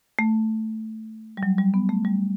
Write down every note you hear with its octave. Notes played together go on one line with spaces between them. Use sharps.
A3
G3
F#3
G3
B3
A3
G3